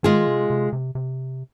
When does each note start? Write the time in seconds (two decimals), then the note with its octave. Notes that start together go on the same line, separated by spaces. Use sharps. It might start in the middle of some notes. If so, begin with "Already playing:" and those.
0.03 D#3 G#3 F4 G#4
0.27 C3
0.50 C3
0.73 C3
0.95 C3